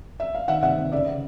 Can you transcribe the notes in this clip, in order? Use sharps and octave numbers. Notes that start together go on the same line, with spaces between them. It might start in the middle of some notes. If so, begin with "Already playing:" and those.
E5
F5
D#3 E5 F#5
C3 E5 F#5
C3
C#3 D5 E5